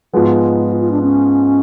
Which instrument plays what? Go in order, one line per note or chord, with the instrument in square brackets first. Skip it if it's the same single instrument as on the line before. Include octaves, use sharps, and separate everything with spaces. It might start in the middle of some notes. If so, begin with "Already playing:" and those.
[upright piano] G#2 F3 G#3 B3 [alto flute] F#4
[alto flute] F4
F4
D4
C#4